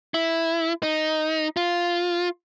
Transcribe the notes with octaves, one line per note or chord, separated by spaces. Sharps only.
E4
D#4
F4